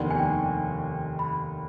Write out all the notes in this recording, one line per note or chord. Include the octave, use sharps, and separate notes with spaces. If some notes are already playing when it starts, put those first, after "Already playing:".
Already playing: F1 D#2 D#3 B3 D4
G#5
G5
B5